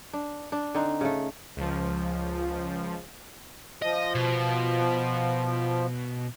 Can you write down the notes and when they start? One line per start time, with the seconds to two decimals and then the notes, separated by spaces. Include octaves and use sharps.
0.13 D4
0.52 D4
0.75 D3 C4 D#4
1.01 C#3 A3
1.56 C#2 F3
3.82 F3 D#5
4.15 B2